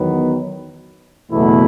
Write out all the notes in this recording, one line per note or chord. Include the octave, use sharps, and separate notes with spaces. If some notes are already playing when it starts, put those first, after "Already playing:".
Already playing: E2 D#3 F#3 B3
F#1 E2 B2 A3 E4